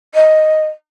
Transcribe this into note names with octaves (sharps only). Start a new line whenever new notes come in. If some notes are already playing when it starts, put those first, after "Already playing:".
D#5